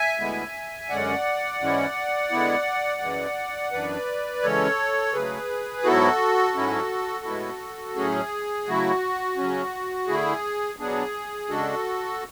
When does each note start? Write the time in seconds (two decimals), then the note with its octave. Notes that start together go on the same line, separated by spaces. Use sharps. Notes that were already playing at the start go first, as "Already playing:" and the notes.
Already playing: E5 G#5
0.19 D2 D3 G#3 B3 E4
0.89 F#2 D3 G#3 C#4 D5 F#5
1.61 G#2 E3 G#3 C#4 E4
2.31 D3 G#3 B3 E4
3.01 F#2 E3 G#3
3.72 F#2 E3 B3 D4 B4 D5
4.42 C#3 E3 G#3 C#4 A4 C#5
5.13 C#3 F#3 A3 G#4 B4
5.84 G#2 F#3 B3 E4 F#4 A4
6.55 G#2 F#3 C#4 E4
7.25 A2 G#3 B3 E4
7.96 A2 F#3 A3 C#4 G#4
8.67 C#3 F#3 A3 E4 F#4
9.37 C#3 F#3 C#4
10.08 D3 A3 E4 G#4
10.79 B2 F#3 B3 D4 G#4
11.49 C#3 G#3 D4 F#4 A4